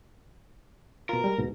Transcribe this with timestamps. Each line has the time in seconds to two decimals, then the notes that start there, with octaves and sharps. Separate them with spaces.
1.09 B2 F4 A#4
1.24 G3 G#3
1.38 D2 G#2 B2